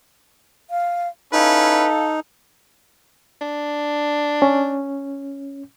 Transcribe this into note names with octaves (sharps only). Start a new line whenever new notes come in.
F5
C#4 D#4 E4 A4 B4 F5
D4
C#4